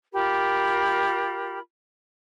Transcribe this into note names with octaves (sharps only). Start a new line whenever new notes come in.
F4 G4 A#4 B5